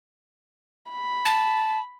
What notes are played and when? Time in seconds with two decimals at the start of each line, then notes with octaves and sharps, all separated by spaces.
0.91 B5
1.25 A5